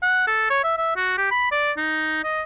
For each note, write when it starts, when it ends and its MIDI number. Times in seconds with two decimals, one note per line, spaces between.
0.03 0.27 78
0.27 0.50 69
0.50 0.61 73
0.64 0.76 76
0.77 0.95 76
0.96 1.17 66
1.18 1.29 67
1.31 1.48 83
1.52 1.72 74
1.77 2.23 63
2.24 2.42 75